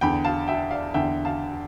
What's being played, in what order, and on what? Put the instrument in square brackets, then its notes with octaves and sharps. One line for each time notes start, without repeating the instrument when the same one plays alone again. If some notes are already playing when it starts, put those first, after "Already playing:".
[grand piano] E2 D3 G5 B5
F5 A5
E5 G5
D5 F5
E2 D3 E5 G5
F5 A5